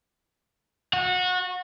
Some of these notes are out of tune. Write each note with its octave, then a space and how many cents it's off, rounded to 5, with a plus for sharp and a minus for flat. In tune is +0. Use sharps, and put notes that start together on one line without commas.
F#4 -25